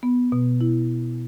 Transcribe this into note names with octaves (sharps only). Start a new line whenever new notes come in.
B3
B2
E4